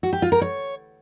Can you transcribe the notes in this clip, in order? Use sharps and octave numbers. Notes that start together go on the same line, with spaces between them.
F#4
G4
F4
A#4
C#5